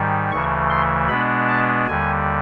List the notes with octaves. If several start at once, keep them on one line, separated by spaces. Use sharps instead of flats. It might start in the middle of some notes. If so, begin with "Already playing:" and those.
Already playing: G#2 D#3 G3
D2 C#3 E3 A3 C#6
C6
B2 G#3 B3 D4 B5
A5
D#2 D3 G3 G#5